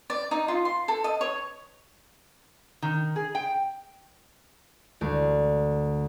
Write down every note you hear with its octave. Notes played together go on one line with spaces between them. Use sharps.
D5
D#4
F4
C6
A4
D#5
C#5
D#3
G#4
G5
D2